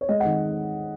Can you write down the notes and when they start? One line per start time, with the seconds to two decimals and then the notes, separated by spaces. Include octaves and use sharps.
0.01 C#5
0.09 G#3 D#5
0.20 D#3 F#5